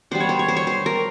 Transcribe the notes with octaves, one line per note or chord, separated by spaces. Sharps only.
G3 B3 D4 C5
C#5
C5
C#5
C5
C#5
C5
A#4